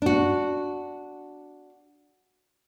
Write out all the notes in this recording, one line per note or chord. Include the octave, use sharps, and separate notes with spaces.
D4 F#4